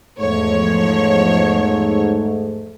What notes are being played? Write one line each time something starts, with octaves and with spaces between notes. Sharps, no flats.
E2 G#2 F3 A3 C#5